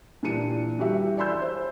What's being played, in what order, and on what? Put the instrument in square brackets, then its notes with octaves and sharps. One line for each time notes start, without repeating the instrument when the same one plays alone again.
[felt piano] A#2 E3 D4 G4 C#7 D#7
E3 G3 F#4 G4 E5
D5 G#5 B5 C6 E6 G6
E5
C5